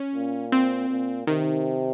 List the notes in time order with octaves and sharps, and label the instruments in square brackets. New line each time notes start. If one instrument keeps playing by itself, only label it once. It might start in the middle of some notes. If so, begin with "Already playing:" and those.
Already playing: [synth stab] C#4
[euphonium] A#2
[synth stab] C4
[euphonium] A#2
[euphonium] C3 [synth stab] D#3